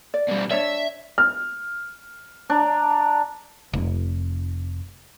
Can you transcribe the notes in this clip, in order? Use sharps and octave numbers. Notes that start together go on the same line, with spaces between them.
D5
B2 G3
D4 C#5 D5 E5
F6
D4 A#5
F1